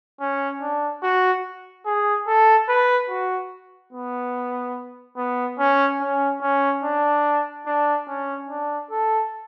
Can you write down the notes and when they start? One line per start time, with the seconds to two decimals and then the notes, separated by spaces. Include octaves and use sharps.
0.20 C#4
0.61 D4
1.02 F#4
1.85 G#4
2.27 A4
2.68 B4
3.10 F#4
3.93 B3
5.17 B3
5.59 C#4
6.00 C#4
6.42 C#4
6.84 D4
7.66 D4
8.08 C#4
8.49 D4
8.90 A4